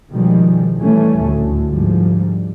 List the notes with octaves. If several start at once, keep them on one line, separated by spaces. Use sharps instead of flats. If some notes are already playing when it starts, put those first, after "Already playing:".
B2 D#3 F3 G3 G#3
A2 E3 G3 A3 C#4
D2 A2 D3
G#2 D3 F3 G3